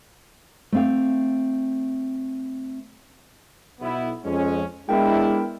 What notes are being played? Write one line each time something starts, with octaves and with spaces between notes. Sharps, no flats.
A3 C4 F5
B1 B3 E4
F2 G#3 C#4
G#3 B3 D4 E4 A#4 G5